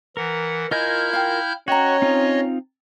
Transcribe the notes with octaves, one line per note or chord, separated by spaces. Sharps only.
E3 A#4 F#5
E4 F4 A#4 D#5 G#5 F6 G6
F5 G5
C#4 F#4 C#5 D#5 G5 A#5
C4 D#4 F4